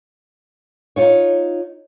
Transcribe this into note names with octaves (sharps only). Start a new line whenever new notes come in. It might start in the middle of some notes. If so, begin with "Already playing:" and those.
D#4 F4 C#5